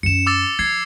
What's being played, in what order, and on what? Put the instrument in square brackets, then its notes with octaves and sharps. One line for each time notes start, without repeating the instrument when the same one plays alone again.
[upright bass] F#2 C#4 [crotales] C#7 E7
[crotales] D6 E6 A6
[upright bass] F3 [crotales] G#6 C7